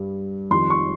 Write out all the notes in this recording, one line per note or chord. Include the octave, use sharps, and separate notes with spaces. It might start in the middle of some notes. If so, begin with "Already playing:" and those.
Already playing: G2 G3
F2 D#3 G3 C6
C#6